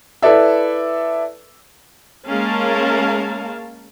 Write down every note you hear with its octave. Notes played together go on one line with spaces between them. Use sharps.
E4 A4 B4 D5 E5
G#3 A#3 C#4 A#4 F5 A5